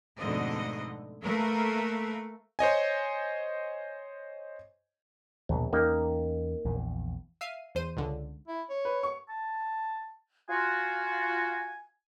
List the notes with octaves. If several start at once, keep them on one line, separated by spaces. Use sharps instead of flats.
F2 G#2 B2 D3 A3 D#5
A3 A#3 A#4 B4 F5
C5 C#5 D#5 G#5
A#1 D#2 B2 F#3
E2 A#3 C#4 D#4 G4
A#1 E2
E5 F5 C7 D#7
E2 C5 D#7
C#2 D3
E4
C#5
B4
C#6
A5
F4 F#4 G#5